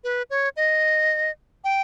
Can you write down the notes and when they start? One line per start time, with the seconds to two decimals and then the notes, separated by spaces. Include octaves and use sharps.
0.04 B4
0.30 C#5
0.56 D#5
1.64 G5